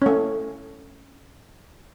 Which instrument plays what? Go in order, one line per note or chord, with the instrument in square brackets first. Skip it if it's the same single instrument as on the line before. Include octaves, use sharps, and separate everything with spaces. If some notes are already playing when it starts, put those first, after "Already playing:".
[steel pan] A3 C#4